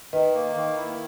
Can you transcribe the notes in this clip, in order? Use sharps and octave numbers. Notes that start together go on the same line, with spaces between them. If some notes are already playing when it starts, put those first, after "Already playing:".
D#3 B4 D#5
A#3
D#3
E4